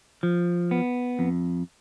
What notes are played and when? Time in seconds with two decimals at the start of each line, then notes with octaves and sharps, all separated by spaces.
0.23 F3
0.71 B3
1.19 F2